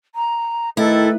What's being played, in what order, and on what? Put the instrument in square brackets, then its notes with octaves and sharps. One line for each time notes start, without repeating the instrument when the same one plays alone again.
[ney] A#5
[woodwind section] D#3 A4 [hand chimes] A3 [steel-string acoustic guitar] E4 [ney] B4